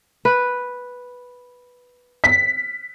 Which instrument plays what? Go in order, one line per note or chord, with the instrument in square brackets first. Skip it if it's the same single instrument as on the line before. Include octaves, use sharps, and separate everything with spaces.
[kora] B4
[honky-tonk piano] B6